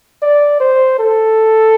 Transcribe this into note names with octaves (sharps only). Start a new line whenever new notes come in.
D5
C5
A4